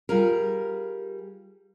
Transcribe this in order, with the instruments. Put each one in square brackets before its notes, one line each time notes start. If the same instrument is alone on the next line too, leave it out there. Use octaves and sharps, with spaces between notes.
[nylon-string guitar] G3 F4 G#4 A#4